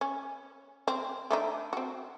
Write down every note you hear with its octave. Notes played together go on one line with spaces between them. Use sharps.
C#4
C4
A3 D4 D#4
C4 F#4